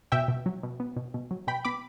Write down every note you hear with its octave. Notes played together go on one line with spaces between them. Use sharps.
B2 E5 G5
B2
F#3
B2
B3
B2
B2
F#3
B2 G5 B5
B3 B5 D6